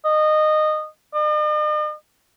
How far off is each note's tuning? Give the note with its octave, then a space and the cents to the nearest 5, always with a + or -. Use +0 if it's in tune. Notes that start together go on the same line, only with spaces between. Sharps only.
D#5 -20
D#5 -45